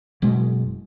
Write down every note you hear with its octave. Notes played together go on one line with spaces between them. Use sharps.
F#1 B2 G#3